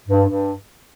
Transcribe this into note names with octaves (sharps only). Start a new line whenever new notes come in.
G2
G2